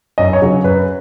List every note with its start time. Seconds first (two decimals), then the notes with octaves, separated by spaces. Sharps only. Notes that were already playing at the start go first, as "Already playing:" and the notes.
0.18 F#2 D#5
0.33 C#5
0.42 C#3 F#3
0.64 F#2 B4